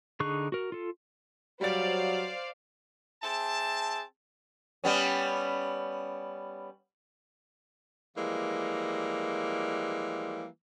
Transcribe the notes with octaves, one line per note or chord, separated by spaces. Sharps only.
D3 D#4 G#4 C#6 F#6
F#4 A#4
F4 A4
F#3 G3 C5 D5 F5 A6
C4 G#4 E5 A5
G3 B3 C#4
E3 F3 G3 G#3 A#3